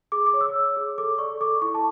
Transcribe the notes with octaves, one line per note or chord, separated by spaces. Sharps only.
G#4 D6
D6
C#5
E6
C#5
G#4
A4 D6
D5 C#6
A4 D6
E4 C#6
A5